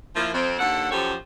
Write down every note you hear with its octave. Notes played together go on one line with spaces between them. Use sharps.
F3 A#3 E4
F2 C4
D#2 D3 A4 F#5
F#2 F3 G4 A4 C5 C#5